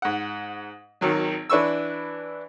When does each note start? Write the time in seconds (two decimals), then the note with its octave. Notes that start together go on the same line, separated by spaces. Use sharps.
0.02 G#2 F#5
1.01 G#1 D#3 F#3
1.50 E3 D4 B4 C#6 E6